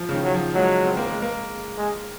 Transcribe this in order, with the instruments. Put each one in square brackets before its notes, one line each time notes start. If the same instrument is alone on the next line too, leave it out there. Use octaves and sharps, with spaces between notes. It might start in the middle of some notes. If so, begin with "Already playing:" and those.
Already playing: [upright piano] F3
C#3
D#3
[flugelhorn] F#3
[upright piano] F3
[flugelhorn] F#3 [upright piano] G#3
[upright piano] C4
A#3
G#3
A#3
[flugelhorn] G#3